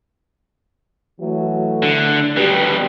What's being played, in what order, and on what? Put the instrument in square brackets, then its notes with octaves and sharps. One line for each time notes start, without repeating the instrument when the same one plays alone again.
[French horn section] E3 F#3 A3
[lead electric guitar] D3
[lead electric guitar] B2 G3 [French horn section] G4 B4